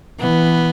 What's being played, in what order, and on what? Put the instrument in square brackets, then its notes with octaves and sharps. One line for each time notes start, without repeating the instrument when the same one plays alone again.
[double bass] E3 [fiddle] B3